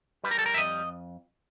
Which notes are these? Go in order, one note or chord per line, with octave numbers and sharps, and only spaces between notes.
G3 B4
A#4
A4
A#4
E5
F2 D#5